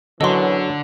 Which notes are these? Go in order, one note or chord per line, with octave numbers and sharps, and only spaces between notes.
F#2 B2 D3 E3 F#3 A4 D#5 C6